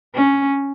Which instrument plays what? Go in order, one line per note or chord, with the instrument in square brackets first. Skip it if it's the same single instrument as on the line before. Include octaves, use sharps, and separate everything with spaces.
[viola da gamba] C#4